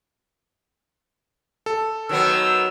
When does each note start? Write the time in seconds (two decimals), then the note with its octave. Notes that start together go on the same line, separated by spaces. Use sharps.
1.66 A4
2.09 D#3 F#3 B3 E6